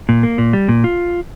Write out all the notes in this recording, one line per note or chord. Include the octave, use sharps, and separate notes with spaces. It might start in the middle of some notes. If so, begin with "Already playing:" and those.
A#2
A#3
A#2
G3
A#2
F4